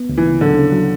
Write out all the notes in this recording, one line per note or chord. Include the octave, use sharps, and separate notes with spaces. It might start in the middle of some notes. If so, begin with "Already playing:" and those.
Already playing: B3
D2
E3
C#3
D3 F#3
C#3
F#3